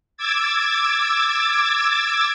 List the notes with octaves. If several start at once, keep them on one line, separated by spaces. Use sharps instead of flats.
D6 E6 G#6 A6